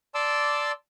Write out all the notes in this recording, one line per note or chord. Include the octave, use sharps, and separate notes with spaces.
D5 A5 C6 D6 E6